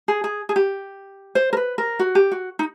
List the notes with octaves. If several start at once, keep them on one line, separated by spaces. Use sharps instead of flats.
G#4
G#4
G#4
G4
C5
A#4
B4
A#4
F#4
G4
F#4
D#4